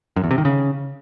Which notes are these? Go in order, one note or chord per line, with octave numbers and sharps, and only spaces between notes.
F#2
E2
C3
D#3
C#3